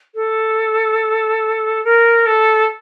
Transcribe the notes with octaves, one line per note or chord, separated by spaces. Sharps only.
A4
A#4
A4